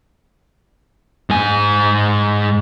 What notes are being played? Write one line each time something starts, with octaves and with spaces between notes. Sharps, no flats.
G#2 G#5